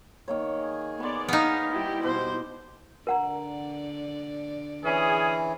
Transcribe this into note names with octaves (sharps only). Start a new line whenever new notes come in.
D#3 A#3 C#5
G#4
B3 D5 C6 C#6
B3 D#4 F5
G3 E4 G4
B2 C5 D6
D3 A#4 D5 F#5 A#5
E3 C#4 G#4